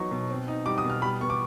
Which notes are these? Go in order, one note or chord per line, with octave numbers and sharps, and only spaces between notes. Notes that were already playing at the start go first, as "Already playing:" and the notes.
Already playing: F#3 B3 D#4 C#6
B2
C4
D#4
G3 D6
D#6
B2
F6
G3 B5
B3 C#6
D6